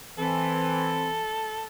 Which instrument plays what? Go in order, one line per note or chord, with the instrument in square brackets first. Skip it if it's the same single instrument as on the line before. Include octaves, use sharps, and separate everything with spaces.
[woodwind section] E3 [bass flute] C4 [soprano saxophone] A4